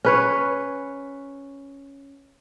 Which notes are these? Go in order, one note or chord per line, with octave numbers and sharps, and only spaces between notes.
C#4 B4 C#5